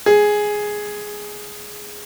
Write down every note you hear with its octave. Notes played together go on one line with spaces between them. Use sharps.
G#4